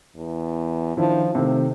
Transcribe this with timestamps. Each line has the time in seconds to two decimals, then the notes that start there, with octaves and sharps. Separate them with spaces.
0.17 E2
0.97 D#3 F3 D4 E4
1.35 C3 D#3 A3 C5